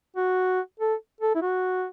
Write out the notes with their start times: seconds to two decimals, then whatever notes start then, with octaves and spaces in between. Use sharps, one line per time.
0.16 F#4
0.80 A4
1.21 A4
1.35 E4
1.42 F#4